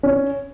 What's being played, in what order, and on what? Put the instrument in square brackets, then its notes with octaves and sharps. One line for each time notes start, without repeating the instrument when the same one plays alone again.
[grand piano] C#4